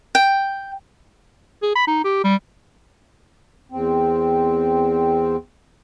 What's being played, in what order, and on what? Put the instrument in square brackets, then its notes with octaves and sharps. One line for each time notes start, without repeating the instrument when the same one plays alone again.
[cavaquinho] G5
[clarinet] G#4
B5
D#4
G4
G3
[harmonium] E2 C4